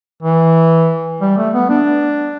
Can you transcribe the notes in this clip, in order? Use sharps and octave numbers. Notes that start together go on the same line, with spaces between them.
E3
G3
A3
B3
D4